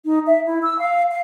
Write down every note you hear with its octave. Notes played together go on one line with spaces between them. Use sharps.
D#4
E5
E4
E6
F5
F5